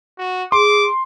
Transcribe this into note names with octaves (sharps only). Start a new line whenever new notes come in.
F#4
G#4 C6 D6